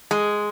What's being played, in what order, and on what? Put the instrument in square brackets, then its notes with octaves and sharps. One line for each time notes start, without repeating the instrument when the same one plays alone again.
[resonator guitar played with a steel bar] G#3